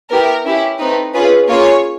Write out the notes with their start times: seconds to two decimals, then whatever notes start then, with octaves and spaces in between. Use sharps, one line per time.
0.10 B3 E4 G4 A#4
0.46 C#4 E4 G4
0.79 A3 C4 D#4 B4
1.14 C#4 F4 G#4 B4
1.48 A#3 C#4 F4 G#4 C#5